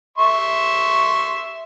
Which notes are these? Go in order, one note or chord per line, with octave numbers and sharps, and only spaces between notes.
E5 C6 C#6